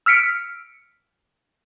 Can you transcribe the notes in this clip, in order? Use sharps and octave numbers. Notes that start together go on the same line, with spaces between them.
E6 F6 B6 C#7 D7